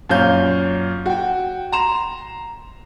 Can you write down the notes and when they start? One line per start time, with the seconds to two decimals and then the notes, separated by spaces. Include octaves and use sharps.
0.10 F#2 A#2 C#4 F5 G6
1.06 F#4 G5
1.72 A#5 C6 E7